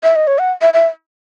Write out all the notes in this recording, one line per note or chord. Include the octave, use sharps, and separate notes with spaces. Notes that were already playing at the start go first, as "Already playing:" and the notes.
E5
D#5
C#5
F#5
E5
E5